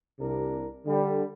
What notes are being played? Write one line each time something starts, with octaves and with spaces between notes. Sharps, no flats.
C2 C3 D4 A#4
D3 G3